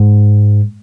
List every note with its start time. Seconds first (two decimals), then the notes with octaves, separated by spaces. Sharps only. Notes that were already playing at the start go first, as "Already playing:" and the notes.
Already playing: G#2